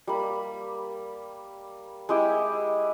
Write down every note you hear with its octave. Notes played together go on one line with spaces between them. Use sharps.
G3 A#3 B5
G#3 E4 G4 G5